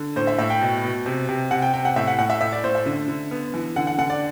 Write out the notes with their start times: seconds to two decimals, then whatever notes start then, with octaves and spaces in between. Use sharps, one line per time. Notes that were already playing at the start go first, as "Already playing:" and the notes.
Already playing: D3
0.16 A2 C5
0.27 E5
0.38 A2 E5
0.50 G5
0.61 B2
0.84 B2
1.06 C3
1.29 C3
1.51 C3 F#5
1.62 G5
1.73 C3 G5
1.85 F#5
1.96 A2 E5
2.07 F#5
2.18 A2 F#5
2.30 E5
2.41 A2 E5
2.52 D5
2.64 A2 C5
2.75 E5
2.86 D3
3.08 D3
3.31 B3
3.54 E3
3.76 D3 F#5
3.87 F#5
3.98 D3 F#5
4.10 D5